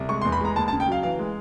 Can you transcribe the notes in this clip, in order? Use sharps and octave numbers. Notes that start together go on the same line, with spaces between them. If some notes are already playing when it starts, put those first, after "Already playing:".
Already playing: C2
G#3 C#6
C6
E2
B5
G#3 A#5
D#2 A5
A5
C#3
G5
F#3 F5
E3 F5
G#3